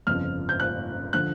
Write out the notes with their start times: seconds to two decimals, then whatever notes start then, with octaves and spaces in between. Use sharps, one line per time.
0.07 G1 F2 C#3 F3 F6
0.49 G6
0.60 F#6
1.13 D3 F3 F#6